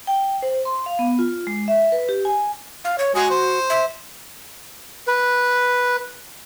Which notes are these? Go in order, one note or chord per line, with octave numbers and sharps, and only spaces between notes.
G5
C5
C6
F5
B3
F4
G#3
E5
B4
G4
G#5
F5
C#5
G#3 F#4 G#4
C5
E5
B4